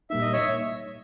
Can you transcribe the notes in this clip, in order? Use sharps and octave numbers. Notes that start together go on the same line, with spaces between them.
A#2 G3 A#3 D#4 E5
D#5
C#5 E5